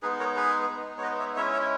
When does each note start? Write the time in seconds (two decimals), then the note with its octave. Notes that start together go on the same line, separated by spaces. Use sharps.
0.02 G#3 B3 D#4 G#4 B4
0.19 A#4 C#5
0.36 G#4 B4
0.70 G#3 B3 D#4
0.98 C#5
1.03 B4 D#5
1.19 C#5 E5
1.36 G#3 C#4 E4 C#5 E5
1.53 C#5 E5